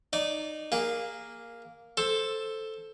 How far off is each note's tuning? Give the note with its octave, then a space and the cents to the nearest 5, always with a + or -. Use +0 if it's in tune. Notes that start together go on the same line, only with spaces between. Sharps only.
D#4 -20 D5 -10
A#3 +0 G#4 -20
A4 +0 C5 +10